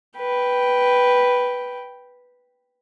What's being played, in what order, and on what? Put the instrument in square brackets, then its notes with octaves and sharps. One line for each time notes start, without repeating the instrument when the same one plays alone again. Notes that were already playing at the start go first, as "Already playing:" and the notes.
[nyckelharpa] B4 G5